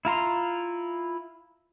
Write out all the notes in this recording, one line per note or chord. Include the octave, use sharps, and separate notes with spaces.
E4 F4 A#5 C6